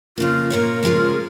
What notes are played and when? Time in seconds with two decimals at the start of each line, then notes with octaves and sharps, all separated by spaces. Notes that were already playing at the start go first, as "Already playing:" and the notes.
0.18 F2 C#3 A#3 F4
0.50 A#2 A#3 F4 A#4 C#5
0.83 C#3 F3 G#3 F4 G#4